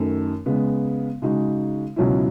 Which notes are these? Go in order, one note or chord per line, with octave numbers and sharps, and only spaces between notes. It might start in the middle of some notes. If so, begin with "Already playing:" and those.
Already playing: F#2 D#3 A3
C#3 G#3 B3
C#3 G#3 D#4 F#4
C#2 B2 F#3 C#4 E4